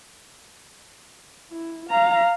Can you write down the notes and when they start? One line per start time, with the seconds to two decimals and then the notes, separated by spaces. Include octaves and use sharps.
1.51 E4
1.90 F5 A#5